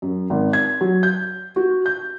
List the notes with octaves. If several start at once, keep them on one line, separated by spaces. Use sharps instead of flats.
F#2
G#1
G#6
F#3
G6
F#4
G6